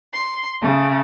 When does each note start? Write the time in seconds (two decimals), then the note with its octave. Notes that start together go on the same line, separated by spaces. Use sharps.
0.13 C6
0.61 C#3 A3